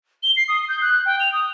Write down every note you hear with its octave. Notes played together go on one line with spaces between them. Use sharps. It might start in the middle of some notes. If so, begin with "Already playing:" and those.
G7
C7
D#6
G6
F#6
G5
F7
D#6